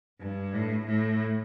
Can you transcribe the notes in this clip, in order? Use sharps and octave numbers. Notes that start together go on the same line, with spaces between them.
G2
A2
A2